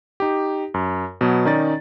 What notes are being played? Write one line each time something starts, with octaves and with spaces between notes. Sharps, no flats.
D#4 G4
F#2
B2 F#3 B3
D#3 C#4 D#4 D5 A6